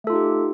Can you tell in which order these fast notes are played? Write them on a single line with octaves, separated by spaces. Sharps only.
A3 A4 F4 D#4 G4